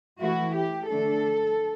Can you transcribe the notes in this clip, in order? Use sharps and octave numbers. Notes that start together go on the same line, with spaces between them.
E3 A3 E4 F#4
G4
D3 A3 D4 A4